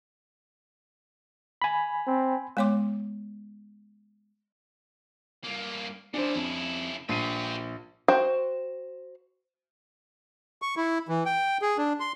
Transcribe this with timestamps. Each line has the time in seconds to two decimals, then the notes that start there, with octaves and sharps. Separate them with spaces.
1.62 G#5 B5
2.07 C4
2.57 G#3 B3 C#5 C6 D6
5.44 G2 A#3
6.14 C#3 D4 E4 C5
6.35 F2
7.09 A#1 G4 B4 C7 D#7
8.08 F#4 C5 G5
10.62 C#6
10.77 E4
11.09 E3
11.26 G5
11.62 G#4
11.78 D4
12.00 C6